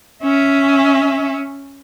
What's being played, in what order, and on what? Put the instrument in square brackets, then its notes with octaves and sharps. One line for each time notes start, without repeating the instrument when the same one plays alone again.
[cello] C#4 E5